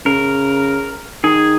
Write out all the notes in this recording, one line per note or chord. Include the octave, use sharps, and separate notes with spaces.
C#3 A#4
D#3 G#4